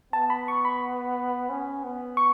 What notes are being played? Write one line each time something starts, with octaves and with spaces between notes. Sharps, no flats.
B3 A5
B5
C#6
B5
C#4
B3
C#6